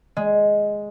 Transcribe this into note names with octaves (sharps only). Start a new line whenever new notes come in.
G#3